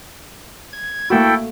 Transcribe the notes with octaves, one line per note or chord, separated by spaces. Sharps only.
G#6
A3 A#3 E4 F#4 A4 G5